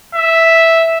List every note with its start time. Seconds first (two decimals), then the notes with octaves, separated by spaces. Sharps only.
0.15 E5